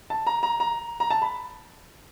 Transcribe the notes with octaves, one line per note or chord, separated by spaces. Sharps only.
A5
A#5
A#5
A#5
A#5
A5
B5